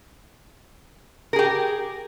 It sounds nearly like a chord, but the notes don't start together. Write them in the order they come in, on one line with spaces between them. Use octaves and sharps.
A#4 G#4 G4